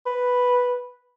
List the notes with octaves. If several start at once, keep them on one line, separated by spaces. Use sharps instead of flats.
B4